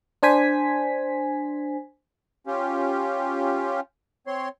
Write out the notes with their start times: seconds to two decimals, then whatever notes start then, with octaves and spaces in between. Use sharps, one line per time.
0.23 D4 C5 G#5 B6
2.47 C#4 F4 G4
4.27 C4 C#5 C6